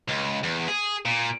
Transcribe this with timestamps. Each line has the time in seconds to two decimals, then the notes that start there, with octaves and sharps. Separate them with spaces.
0.08 C#2
0.44 E2
0.68 G#4
1.05 A#2